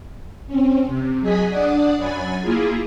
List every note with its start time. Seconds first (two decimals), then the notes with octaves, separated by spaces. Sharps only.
0.47 C4 C#4
0.87 C3
1.21 F#3 G#4 D#5 G#5 B6
1.50 D4 D5 F#5 D#6
1.96 F#2 F#3 G#5 B5 A6
2.41 A#3 E4 F4 G#4